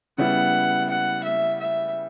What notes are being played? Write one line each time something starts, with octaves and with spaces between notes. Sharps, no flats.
C#3 G3 B3 E4 F#5
F#5
E5
E5